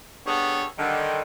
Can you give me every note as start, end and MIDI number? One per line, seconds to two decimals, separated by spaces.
0.26 0.65 55
0.26 0.65 59
0.26 0.65 62
0.26 0.65 68
0.26 0.65 69
0.26 0.65 73
0.78 1.22 50
0.78 1.22 51
0.78 1.22 55